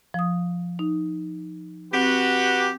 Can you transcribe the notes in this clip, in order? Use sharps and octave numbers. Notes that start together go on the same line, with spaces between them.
F3 D#6
D#4
C4 F#4 G4 B4